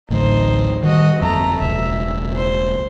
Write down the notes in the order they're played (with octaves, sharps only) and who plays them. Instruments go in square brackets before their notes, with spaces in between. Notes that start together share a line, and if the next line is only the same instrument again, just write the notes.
[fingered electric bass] A1 D2 A2 [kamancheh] D#4 C5
[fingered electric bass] D#3 G3 [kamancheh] F#4 D#5
[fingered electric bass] G1 F2 [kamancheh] A3 A#5
[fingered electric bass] E1 C#2 [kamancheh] E5
[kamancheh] C5